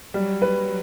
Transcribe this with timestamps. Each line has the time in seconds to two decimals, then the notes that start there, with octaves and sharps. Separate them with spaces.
0.14 F#3 G3
0.42 B4